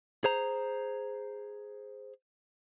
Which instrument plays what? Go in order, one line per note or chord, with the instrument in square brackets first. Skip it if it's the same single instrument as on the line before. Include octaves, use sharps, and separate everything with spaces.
[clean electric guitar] G#4 C5 A#5